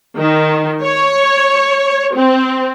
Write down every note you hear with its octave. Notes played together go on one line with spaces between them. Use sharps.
D#3
C#5
C4